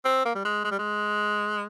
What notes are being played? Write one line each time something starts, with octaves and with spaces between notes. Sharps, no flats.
C4
A#3
G3
G#3
G#3
G3
G#3